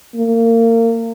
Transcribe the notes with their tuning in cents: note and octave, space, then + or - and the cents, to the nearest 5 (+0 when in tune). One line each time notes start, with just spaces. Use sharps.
A#3 -30